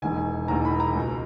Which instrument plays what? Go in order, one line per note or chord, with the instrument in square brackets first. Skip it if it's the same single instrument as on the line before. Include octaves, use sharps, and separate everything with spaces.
[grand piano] E1 E2 D#3 G#5
E1 E2 D#3 A#5
B5
A#5
C#2 B2